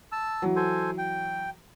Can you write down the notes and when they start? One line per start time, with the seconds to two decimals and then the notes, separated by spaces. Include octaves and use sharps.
0.12 A5 E6
0.42 E3 F#3
0.56 A4 C5 G#5
0.98 G5